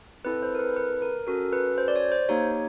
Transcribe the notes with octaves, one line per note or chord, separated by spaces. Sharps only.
C4 E4 A4 B4
C5
A#4
B4
B4
A#4
C#4 F#4 A4 A#4
B4
C5
D5
C#5
C5
A#3 D#4 G4 C#5